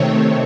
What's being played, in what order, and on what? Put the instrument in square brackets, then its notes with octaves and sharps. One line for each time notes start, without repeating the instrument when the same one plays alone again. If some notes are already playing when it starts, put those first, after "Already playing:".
Already playing: [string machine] C3 D#3 A3 C4 C#5